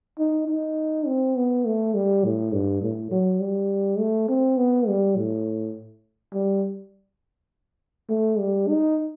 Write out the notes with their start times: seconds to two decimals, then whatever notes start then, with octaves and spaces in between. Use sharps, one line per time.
0.19 D#4
0.48 D#4
1.07 C4
1.36 B3
1.65 A3
1.94 G3
2.24 A2
2.52 G2
2.82 A2
3.11 F#3
3.40 G3
3.99 A3
4.29 C4
4.57 B3
4.88 G3
5.17 A2
6.33 G3
8.09 A3
8.39 G3
8.68 D#4